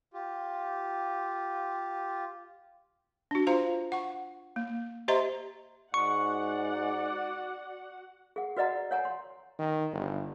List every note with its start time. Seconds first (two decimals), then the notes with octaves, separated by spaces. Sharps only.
0.13 F4 G4
3.31 D4 F#4
3.47 F4 C5 F5 A#5
3.92 F#5 C#6
4.56 A#3
5.08 G4 C5 D#5 E5 A#5 C6
5.94 G#2 F#4 D5 F#5 C#6
8.36 G#4 F#5
8.57 F#4 B4 D5 D#5 F#5 A#5
8.91 C#5 F#5 G#5 A#5
9.05 C6
9.59 D#3
9.92 G1